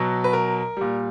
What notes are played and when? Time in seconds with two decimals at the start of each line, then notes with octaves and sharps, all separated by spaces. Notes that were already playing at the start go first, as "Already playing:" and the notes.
Already playing: B2 F#3
0.24 B4
0.33 A#4
0.77 A#2 G3